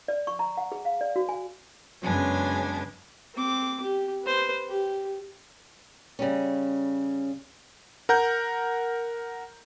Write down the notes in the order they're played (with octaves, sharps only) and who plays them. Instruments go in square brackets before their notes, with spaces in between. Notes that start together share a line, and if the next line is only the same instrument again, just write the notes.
[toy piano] D5
C#6
A#5
F#5
G#4
F5
D5
F#4
G#5
[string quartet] F#2 C#3 G#3 B3 D4 G#5
[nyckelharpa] C4 D6
G4
B4 C5
G4
[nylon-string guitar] C#3 G3 C#4
[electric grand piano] A#4 F#5 A#5 G6